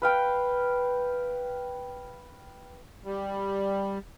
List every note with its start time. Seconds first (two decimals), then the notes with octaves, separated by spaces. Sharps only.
0.02 B4 F5 G5
3.05 G3